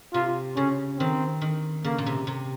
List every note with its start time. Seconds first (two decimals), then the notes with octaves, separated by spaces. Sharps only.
0.14 C3 F4
0.57 C#3 C#4
0.99 D#3 C4
1.41 D#3
1.84 C#3 A#3
1.98 A#2
2.06 C3
2.27 C3